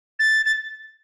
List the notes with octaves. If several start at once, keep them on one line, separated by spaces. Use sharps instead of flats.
A6
A6